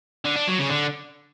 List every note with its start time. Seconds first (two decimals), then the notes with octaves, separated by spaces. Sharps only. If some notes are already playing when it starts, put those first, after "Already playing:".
0.25 D3
0.36 D4
0.47 F#3
0.59 C#3
0.70 D3